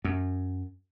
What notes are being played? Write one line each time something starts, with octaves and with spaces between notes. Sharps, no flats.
F#2